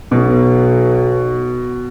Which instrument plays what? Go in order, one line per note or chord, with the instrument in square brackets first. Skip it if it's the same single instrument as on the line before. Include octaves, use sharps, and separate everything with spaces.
[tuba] B1 [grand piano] B2